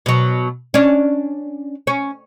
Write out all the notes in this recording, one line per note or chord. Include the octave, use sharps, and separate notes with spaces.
B2 F#3
C#4 D4
C#4